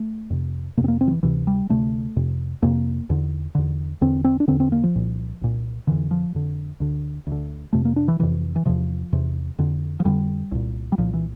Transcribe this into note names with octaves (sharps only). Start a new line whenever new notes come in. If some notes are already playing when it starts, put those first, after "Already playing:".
Already playing: A3
F2 C3
F2 C3 A#3 C4
A#3
C4
F3
E3
D2 C3 E3
G3
D2 C3 A3
F2 C3
F2 C3 A#3
E2 D3
E2 D3
E2 D3 C4
C4
D4
E2 D3 C4
C4
A#3
F3
C2 A#2
C2 A#2
F2 D3 E3
F3
F2 D3
D2 D3
D2
D3
F2 C3 A3
A#3
D4
E3
F2 C3 E3
E3
E2 C3 F3
E2 C3
F2 D3
F3
F2 D3 G3
C2 A#2
G3
C2 A#2 F3
E3